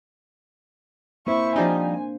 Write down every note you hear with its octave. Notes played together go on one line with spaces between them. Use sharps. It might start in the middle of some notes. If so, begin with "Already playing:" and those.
A#3 C4 E4 C5 C#6
F3 G3 D4 D#4 G#5